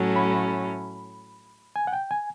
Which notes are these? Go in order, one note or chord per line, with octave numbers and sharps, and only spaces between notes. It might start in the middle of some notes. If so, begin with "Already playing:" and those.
Already playing: A2 F#3 A3 C#4
B5
G#5
F#5
G5
G#5